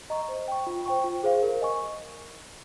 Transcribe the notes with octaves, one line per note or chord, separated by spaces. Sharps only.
D#5 A#5 C#6
C5
G5 C#6
F4
C5 G5 C#6
F4
G#4 C5 F5
A#4
D#5 G#5 C#6